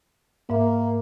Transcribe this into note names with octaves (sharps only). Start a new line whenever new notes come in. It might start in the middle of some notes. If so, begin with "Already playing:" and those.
G#2 A#3 E5